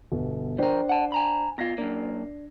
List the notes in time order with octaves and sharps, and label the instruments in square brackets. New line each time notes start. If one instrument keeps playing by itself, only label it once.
[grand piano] G1 B2
[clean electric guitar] F3 A#4 [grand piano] D4 C5 G5
[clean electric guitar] F#5 A5
G#5 A#5 B5
[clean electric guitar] B2 F4 [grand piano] G#6 A#6 C7
[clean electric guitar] F#2 A#3 [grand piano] D4